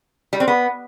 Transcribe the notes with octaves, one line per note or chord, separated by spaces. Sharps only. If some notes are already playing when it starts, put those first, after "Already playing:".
G3
C4
B3